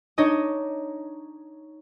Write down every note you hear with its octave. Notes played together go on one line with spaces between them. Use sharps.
D4 D#4 C#5 D#5